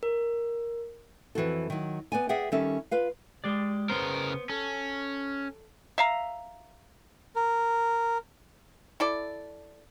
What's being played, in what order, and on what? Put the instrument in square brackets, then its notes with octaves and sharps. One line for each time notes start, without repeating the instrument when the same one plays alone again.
[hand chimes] A#4
[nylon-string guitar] F2 E3 F#4 A4
D#3 F#3
B3 D5 G#5
G#4 D5 E5 F#5 G5
D#3 G3 C#4 A4 E5
F4 B4 F5
[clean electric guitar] G#3 G4 D5
[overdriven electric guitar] C#3 A#4 [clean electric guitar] B3 C5
[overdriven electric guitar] C#4 [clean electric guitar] A4
[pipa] E5 F5 A#5
[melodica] A#4
[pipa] E4 A4 D5